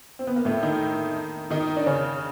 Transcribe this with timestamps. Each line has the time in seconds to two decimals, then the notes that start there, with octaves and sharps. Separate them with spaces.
0.19 C4
0.27 B3
0.36 A#3
0.45 A2 A3
0.63 D#3 D#4
1.50 D#3 D#4
1.77 D4
1.86 C#3 C#4